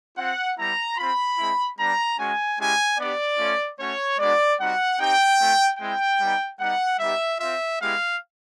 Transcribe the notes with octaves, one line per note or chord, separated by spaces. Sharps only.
C4 F4 F#5
G3 B3 E4 A#5
C4 F4 B5
G#3 C4 E4
G3 B3 D4 A#5
G#3 C#4 F#4 G#5
G#3 C#4 E4 G4 G#5
B3 D4 G4 D5
A3 C#4 F4
A3 C#4 F#4 C#5
G#3 B3 D4 F#4 D5
G3 C4 D#4 F#4 F#5
C4 D#4 G4 G5
A3 C4 F4
G#3 C4 E4 G5
G3 B3 D#4
G3 B3 D#4 F#5
G3 B3 D#4 G4 E5
C4 F4 E5
G#3 B3 E4 G4 F5